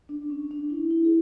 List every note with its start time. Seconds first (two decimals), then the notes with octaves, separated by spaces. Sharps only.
0.09 D4
0.30 C#4
0.51 D4
0.70 E4
0.91 E4
1.04 G#4